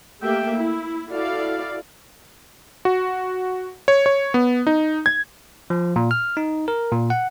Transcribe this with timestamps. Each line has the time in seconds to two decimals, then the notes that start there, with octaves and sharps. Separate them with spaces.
0.22 A3 A#3 G4 E5 G5
0.55 E4
1.11 E4 F#4 A4 D5 F5
2.85 F#4
3.88 C#5
4.06 C#5
4.34 B3
4.67 D#4
5.06 G#6
5.70 F3
5.96 A#2
6.11 F6
6.37 D#4
6.68 A#4
6.92 A#2
7.10 F#5